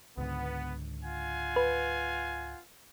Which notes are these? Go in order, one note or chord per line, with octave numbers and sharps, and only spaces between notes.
C#2 G#2 D3 B3
F4 F#5 G#5
B4